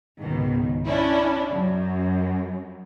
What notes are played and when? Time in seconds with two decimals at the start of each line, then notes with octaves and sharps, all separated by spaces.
0.21 C#2 G#2 B2 D#3
0.86 C#4 D4 E4
1.50 F#2